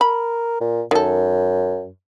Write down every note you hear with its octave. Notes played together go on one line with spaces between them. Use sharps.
A#4 B5
A#2
F#2 D#3 A4